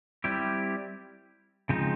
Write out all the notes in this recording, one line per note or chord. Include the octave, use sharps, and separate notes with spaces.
G3 C4 E4 G4
C#3 F3 G#3 C4 D#4